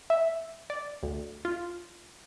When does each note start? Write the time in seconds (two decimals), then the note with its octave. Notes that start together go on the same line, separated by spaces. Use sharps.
0.10 E5
0.70 D5
1.03 D2
1.45 F4